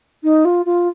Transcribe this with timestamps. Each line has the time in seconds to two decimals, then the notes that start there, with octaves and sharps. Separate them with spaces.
0.23 D#4
0.44 F4
0.65 F4